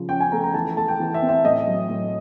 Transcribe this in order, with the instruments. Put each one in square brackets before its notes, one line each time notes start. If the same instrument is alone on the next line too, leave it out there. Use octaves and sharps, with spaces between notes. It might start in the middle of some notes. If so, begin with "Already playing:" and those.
Already playing: [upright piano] C#3 F3
C#4 G5
G#5
A3 A#5
A#5
E3 A5
A3 A5
G5
E3
E5
C4
E5
A2 D#5
F#3
A2